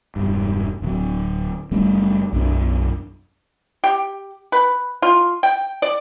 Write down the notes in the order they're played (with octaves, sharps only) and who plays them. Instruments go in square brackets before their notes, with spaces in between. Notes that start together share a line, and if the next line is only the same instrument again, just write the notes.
[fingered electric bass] E1 G2
D1 F#3
F#1 G3 A3 C#4
B1 F#2 D4
[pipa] G4
B4
F4
G5
D5